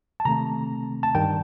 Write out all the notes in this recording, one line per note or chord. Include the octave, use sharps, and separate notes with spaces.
A5
C3 D#3 A3 C4 A#5
A5
G2 D#3 G3 G5